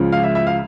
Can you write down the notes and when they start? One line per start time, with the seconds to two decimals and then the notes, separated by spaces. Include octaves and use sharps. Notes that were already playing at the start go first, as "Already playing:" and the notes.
Already playing: C#2 C#3 F3
0.12 F5
0.24 E5
0.35 E5
0.47 F5